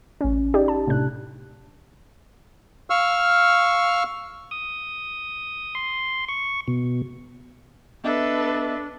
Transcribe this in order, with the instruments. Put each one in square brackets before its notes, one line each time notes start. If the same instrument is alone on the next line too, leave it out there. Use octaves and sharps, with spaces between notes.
[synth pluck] A1 C#4
D#4 G4 D5
A5
A2 C3 D4 F#6
[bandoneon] F5 C#6 E6 F6
[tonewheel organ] D#6
C6
C#6
B2
[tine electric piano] B3 D#5 E5 [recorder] D4 [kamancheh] A4 B4